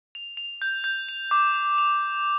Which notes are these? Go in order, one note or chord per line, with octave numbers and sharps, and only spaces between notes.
F7
F7
G6
G6
F7
D6
F7
F7